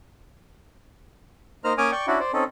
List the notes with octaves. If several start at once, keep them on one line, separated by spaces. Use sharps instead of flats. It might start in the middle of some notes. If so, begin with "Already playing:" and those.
A#3 D#4 C5 A#5 F6
A#3 C#4 G#5 D6 D#6 F6
D5 G5 C#6
C#4 D4 E4 F#4 D5
C5 D5
C4 C#4 D#4 A4